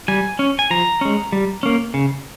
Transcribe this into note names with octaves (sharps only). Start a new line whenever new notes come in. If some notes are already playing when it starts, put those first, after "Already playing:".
G3 G#5
C#4
G#5
F3 A#5
G#3 C#4
G3
A#3 C#4
C#3